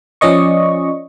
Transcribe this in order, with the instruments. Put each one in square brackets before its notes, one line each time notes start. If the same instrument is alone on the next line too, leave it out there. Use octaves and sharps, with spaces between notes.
[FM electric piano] F3 C#4 D5 D#5 C#6